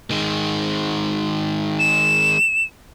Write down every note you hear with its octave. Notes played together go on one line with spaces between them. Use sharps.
D#3 G#3
E7